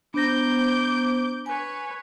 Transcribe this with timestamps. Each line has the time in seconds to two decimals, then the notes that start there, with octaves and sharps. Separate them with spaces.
0.14 B3 D4 C5 A#5 D6 G6 A#6
1.46 B4 C#5 G#5